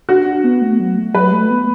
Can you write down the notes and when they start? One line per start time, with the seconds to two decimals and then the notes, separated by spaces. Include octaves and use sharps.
0.09 D4 F#4
0.26 D4
0.44 B3
0.62 A3
0.80 F#3
0.97 A3
1.14 F#3 B4
1.33 A3
1.50 B3